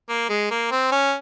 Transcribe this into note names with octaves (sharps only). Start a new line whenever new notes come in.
A#3
G#3
A#3
C4
C#4